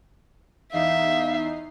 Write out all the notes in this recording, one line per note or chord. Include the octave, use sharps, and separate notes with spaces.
E2 D#4 E5 F5 C7